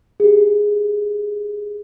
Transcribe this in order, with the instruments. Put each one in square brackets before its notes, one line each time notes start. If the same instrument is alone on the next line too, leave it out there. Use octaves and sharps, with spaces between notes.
[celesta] G4 G#4